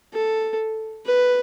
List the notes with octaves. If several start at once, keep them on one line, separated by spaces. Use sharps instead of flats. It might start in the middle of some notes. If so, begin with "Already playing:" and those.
A4
B4